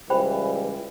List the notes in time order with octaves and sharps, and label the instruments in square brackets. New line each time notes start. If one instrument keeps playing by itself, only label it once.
[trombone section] C#2 E3 G3 [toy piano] C5 G5 B5